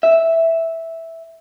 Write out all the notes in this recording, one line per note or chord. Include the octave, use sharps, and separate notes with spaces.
E5